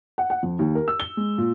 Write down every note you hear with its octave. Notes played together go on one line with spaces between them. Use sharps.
F#5
F#5
F2
D#2
A#4
E6
G7
G#3
A#2